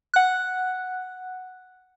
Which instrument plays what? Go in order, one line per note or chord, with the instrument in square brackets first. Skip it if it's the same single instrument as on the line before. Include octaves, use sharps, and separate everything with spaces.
[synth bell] F#5 F#6